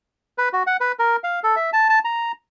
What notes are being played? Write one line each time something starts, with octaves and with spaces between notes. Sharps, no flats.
B4
F#4
F#5
B4
A#4
F5
A4
E5
A5
A5
A#5